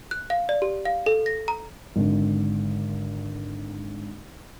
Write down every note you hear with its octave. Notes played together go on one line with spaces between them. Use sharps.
F#6
F5
D5
G4
F5
A4
A#6
A#5
G#1 D3